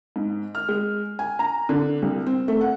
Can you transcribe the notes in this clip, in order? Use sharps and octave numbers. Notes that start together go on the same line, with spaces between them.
G#2
F6
G#3
G#5
A#5
D3
C2
C4
A3
F#5